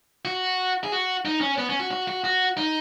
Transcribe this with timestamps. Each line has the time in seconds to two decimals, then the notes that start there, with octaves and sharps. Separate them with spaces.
0.25 F#4
0.84 G#4
0.92 F#4
1.25 D#4
1.41 C#4
1.58 B3
1.70 C#4
1.80 F#4
1.91 F#4
2.08 F#4
2.24 F#4
2.57 D#4